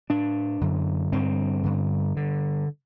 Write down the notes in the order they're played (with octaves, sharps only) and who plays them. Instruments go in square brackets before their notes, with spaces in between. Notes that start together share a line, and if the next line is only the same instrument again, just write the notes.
[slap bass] A2 D4
F#2 D3
G2 D3 C4
G2 D3
G2 D3